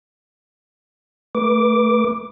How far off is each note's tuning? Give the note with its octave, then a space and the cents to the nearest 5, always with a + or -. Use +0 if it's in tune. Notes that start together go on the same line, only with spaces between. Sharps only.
A3 +0 B4 -30 D6 +0